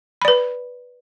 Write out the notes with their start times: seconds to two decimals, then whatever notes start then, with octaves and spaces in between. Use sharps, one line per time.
0.22 B5
0.25 D5
0.28 B4